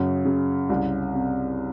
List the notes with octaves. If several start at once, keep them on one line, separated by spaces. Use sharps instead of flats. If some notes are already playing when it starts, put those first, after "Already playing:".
Already playing: F#2 C#3
C#3
C2
C3